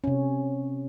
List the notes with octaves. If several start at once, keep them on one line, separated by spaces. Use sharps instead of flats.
C3 C#4